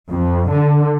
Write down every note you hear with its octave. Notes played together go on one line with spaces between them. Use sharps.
F2
D3